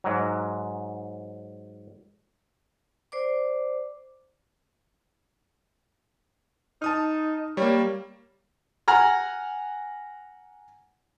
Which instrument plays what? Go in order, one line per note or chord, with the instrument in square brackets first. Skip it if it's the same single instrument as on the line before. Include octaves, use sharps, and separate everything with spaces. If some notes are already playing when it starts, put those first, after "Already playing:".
[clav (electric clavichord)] G#2 F#3
[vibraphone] C5 D5 D6
[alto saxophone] D#4 [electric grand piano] A5 D#6 F6
[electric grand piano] G3 A#3 [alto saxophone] C#5
[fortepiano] F#5 G#5 A#5 F6